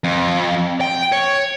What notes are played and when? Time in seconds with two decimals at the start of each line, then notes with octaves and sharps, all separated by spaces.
0.04 F2
0.81 G5
1.12 C#5